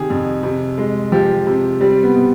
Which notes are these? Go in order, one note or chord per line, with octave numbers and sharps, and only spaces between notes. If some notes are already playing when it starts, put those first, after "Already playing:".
Already playing: C3 D#3 G4 G#4
F2
C3
G#3
F3 G4
C3
G3 C4
B3
B2